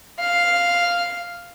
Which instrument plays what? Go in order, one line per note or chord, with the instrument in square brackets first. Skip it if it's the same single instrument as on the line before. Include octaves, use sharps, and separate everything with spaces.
[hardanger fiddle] F5